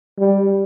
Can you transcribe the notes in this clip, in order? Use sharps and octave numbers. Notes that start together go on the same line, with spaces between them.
G3